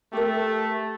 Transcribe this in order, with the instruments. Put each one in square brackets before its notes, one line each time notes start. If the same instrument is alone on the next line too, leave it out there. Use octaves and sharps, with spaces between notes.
[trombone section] A3 [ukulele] G4 A#4